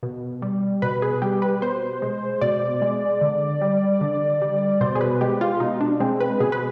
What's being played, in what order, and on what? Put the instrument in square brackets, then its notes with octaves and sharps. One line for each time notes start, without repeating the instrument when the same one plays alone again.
[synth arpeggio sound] B2
G3
B2 B4
G#4
G3 G4
B4
B2 C5
G#3
B2 D5
G#3
D3
G3
D3
G3
B2 C5
G#4
B4
G#3 G4
F4
B2 D#4
D4
G#3 C4
B4
B2 G#4
B4